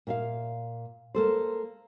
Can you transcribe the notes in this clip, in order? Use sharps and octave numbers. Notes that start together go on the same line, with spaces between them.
A#2 E5 F5
A#3 A4 C5